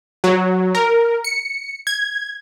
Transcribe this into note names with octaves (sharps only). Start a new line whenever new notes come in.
F#3
A#4
C#7
G#6